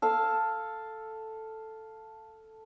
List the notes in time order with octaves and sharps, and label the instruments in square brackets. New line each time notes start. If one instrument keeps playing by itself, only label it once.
[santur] A4 F5 E6